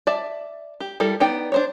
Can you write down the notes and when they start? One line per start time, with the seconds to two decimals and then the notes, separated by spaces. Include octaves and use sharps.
0.07 D5 E5 A5
0.80 G4
1.00 G3 E4 A4 A#4
1.20 B3 D#4 D5 G5
1.52 D4 C5 C#5